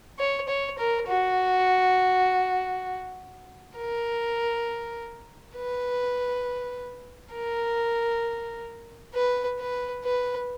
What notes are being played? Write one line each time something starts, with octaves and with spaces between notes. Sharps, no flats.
C#5
C#5
A#4
F#4
A#4
B4
A#4
B4
B4
B4